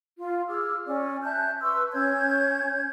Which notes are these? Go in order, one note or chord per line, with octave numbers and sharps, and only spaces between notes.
F4
G#4 D6 E6 F6
C#4 D5
E5 A5 F#6 G6
B4 C6 C#6 E6
C#4 C#5 G6 G#6